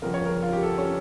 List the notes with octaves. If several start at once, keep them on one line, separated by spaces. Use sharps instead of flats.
G1 F2 C#3 F3 A#4
C#5
A#4
F4
G4
A4
C#4